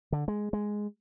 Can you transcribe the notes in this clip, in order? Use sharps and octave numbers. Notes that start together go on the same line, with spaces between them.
D3
G#3
G#3